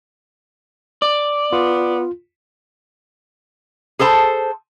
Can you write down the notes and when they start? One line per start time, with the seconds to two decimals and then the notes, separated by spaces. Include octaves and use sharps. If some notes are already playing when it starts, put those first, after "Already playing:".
1.02 D5
1.53 B3 F4
3.99 G#4 A4 C5 A5